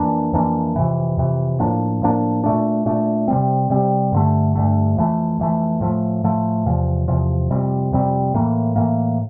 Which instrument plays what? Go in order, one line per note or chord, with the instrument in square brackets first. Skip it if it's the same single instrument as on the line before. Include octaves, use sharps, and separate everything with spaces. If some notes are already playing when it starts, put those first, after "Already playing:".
Already playing: [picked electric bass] F2 E3 A#3 D4
F2 E3 A#3 D4
F2 C3 E3
F2 C3 E3
A2 F3 A#3 D4
A2 F3 A#3 D4
A#2 A3 D4
A#2 A3 D4
C3 G3 C4
C3 G3 C4
G2 D3 A3
G2 D3 A3
F2 E3 A3
F2 E3 A3
A2 F3 A3
A2 F3 A3
E2 C3 F3
E2 C3 F3
F2 C3 G3 C4
F2 C3 G3 C4
A2 E3 A#3
A2 E3 A#3